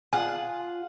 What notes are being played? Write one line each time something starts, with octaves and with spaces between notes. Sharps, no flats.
F4 G#4 F#5 G#5